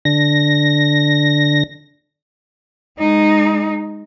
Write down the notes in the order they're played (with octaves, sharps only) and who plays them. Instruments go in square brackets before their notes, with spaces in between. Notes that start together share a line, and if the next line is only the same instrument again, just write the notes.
[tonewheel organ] D3 A#6
[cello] G#3 D#4